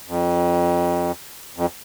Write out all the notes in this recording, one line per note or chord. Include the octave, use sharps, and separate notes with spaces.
F2
F2